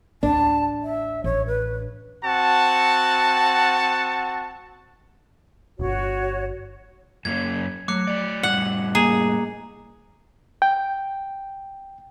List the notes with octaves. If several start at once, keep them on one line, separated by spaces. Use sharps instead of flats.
A1 D2 D4 A5
E5
A1 C#5
B4
C4 F#4 F#5 A5
D1 G1 F#4 C#5
F#2 A#3 C#4 G#6
F#3 A3 D6 F#6 C#7
F#3 D5
A2 G3 F#5
A#3 G#4 D#5 A#5
G5